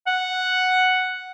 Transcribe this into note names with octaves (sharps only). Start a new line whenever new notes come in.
F#5